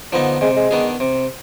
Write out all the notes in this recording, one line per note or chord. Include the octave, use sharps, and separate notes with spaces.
D3 F3 B3 D#4
C3 G#3
G#3
D#3 B3 D4 G#4
C3